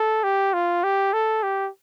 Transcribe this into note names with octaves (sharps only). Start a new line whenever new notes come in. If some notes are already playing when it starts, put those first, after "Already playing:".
Already playing: A4
G4
F4
G4
A4
G4